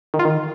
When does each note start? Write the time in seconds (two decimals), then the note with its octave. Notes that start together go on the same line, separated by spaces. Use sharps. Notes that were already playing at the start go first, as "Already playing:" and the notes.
0.14 D#3
0.19 F4
0.25 D#3